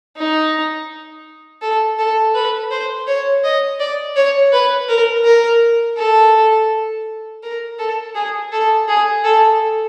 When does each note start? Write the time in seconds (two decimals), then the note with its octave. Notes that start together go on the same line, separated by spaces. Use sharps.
0.17 D#4
1.62 A4
1.99 A4
2.35 B4
2.71 C5
3.07 C#5
3.44 D#5
3.80 D5
4.16 C#5
4.53 B4
4.89 A#4
5.25 A#4
5.98 A4
7.43 A#4
7.79 A4
8.16 G#4
8.52 A4
8.88 G#4
9.24 A4